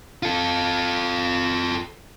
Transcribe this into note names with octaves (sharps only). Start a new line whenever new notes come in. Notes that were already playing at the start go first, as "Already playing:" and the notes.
F4 A4